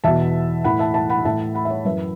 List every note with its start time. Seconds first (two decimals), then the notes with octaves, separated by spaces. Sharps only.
0.04 E2 B2 E5 A5
0.64 A2 E3 F#5 B5
0.79 E5 A5
0.94 E5 A5
1.10 F#5 B5
1.25 A2 E3 E5 A5
1.55 F#5 B5
1.65 E5
1.70 C#5 F#5
1.85 F#2 E3 B4 E5